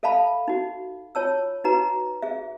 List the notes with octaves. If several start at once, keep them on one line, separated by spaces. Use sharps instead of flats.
A4 E5 F5 A5 B5
D#4 F#4
F4 C#5 A5 E6
D#4 F#4 B4 A#5
G#4 E5